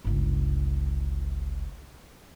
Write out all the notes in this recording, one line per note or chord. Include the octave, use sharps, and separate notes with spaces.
G1 C#2